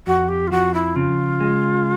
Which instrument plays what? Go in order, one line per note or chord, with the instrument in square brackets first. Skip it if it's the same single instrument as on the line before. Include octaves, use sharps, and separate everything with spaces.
[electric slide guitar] F2 [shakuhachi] F#4
[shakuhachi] G4
F4
[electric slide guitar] F3 [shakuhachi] F#4
[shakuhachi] E4
[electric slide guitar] C#3 [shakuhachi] F4
[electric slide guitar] G#3